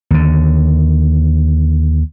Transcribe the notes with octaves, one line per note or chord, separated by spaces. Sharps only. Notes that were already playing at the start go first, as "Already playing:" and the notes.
D#2 D3